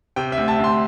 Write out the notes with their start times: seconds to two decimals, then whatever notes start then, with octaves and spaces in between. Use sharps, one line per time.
0.16 C3 G5
0.32 E5
0.37 D2
0.48 A5
0.59 D2
0.64 C6